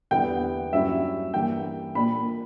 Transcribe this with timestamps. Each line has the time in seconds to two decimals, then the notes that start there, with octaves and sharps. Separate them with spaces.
0.11 E2 D3 G3 B3 E4 G5
0.72 G2 F#3 C#4 E4 E5
1.34 G2 E3 A#3 G5
1.95 A#2 A#3 D4 B5